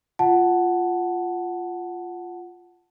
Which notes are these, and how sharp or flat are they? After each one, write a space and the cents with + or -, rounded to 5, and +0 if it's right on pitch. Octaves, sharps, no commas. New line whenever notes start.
F4 +0 F#5 +0 A5 +0